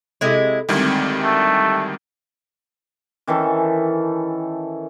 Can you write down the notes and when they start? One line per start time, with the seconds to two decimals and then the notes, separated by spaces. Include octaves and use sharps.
0.21 C3 G#3 E4 A4
0.69 D2 D#3 G3 G#3 C4 E4
1.23 A3
3.27 D#3 E3 C#4 A4